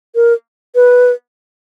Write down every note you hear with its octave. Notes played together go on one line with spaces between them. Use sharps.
A#4
B4